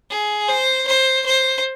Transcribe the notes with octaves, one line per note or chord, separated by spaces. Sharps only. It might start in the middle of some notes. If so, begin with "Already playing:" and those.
G#4
C5
C5
C5